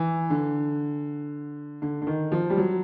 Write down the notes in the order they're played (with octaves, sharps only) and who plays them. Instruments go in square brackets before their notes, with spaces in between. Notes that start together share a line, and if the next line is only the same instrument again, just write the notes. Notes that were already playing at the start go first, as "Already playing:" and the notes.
Already playing: [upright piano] E3
D3
D3
D3
D#3
F3
G3
F#3